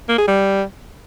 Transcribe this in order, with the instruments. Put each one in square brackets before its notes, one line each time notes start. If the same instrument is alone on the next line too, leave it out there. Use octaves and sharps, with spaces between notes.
[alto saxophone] A#3
G#4
G3